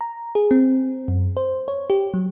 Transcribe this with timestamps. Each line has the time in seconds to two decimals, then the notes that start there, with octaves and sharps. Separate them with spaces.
0.01 A#5
0.35 G#4
0.51 C4
1.08 F#2
1.37 C5
1.68 C#5
1.90 G4
2.14 F#3